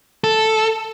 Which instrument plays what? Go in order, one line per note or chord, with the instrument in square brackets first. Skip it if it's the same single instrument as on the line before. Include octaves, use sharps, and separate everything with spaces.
[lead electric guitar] A4